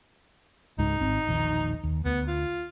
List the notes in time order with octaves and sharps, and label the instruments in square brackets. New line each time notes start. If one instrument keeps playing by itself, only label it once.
[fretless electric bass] C#2 G#2 G#3 [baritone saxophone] D#4
[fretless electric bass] G#1 C4
E1 A#1 D#3
D#2
[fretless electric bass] D2 [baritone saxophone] B3
[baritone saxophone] F4